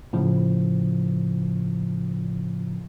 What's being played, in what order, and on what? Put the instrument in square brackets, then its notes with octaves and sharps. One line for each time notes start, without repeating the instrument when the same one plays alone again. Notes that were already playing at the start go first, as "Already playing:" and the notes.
[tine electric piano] A2 C#3 F3